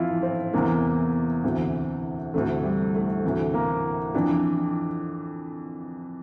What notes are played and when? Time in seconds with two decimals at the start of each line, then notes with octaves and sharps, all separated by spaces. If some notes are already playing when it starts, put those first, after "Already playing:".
Already playing: F2 E3 E4 F4
0.23 C4
0.53 E2 C3 E3 A#3
1.44 D2 C3 E3
2.34 D2 C3 E3 A3
2.64 G3
2.94 A3
3.25 D2 C3 E3
3.54 A#3
4.14 F2 E3 D4